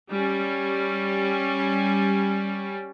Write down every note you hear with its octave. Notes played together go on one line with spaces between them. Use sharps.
G3 C#4